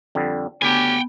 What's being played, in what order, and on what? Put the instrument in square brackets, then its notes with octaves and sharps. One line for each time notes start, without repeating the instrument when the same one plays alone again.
[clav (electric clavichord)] F2 D3 G3
[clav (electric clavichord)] D2 [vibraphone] B3 [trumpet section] C#4 D4 G4 [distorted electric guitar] G5 G#5